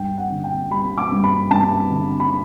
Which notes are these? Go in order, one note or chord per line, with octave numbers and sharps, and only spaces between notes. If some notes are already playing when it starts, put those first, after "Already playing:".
Already playing: G2 G5
F#5
D3
G5
G3 B5
D6
G2
B5
G2 A5
D3
B5